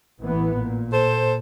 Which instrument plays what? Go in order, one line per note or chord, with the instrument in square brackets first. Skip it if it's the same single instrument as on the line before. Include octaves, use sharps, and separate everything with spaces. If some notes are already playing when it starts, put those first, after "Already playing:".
[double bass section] A1 E3 B3
A#2
[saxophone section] A4 C5